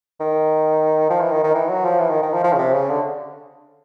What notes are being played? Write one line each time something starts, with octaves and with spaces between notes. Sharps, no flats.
D#3
F3
E3
D#3
D#3
E3
F#3
F3
E3
D#3
D#3
F3
F3
C#3
C3
C#3
D3